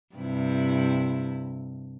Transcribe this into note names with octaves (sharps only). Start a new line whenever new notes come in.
G2 C3 E4